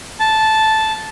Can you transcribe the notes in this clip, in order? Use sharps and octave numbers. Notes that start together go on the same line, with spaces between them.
A5